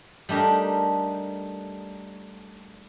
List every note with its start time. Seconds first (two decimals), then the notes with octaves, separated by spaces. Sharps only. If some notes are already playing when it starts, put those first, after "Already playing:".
0.29 G3 A3 D4 D#4 A#4